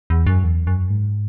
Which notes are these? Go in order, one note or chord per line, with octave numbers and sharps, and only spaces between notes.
E2
F#2
E2
F#2
G#2